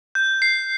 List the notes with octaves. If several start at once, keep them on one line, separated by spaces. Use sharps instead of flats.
G6
C7